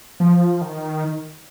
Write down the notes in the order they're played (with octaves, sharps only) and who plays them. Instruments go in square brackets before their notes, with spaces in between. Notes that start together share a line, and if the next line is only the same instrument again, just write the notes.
[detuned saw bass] F3
D#3